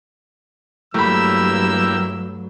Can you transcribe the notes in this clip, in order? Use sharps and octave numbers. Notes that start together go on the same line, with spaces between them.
G2 F#3 A3 A#3 E4 G4 B5 E6